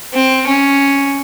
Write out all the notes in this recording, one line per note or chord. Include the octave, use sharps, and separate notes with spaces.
C4
C#4